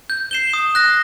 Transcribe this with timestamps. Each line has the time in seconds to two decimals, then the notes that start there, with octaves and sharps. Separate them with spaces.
0.10 G6
0.31 C7 E7 G7
0.53 D#6
0.75 F#6 A#6